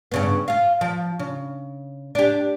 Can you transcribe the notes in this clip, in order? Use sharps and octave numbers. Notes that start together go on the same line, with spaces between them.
G2 C#3 B3
F4 F5
F3
C#3
D4 G4